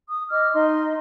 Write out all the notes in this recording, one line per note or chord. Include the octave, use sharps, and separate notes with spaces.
D#6
D#5 D6 F6
D#4 D#5 C6